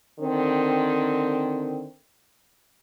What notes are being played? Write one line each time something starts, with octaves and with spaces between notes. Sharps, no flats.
D3 D#3 C4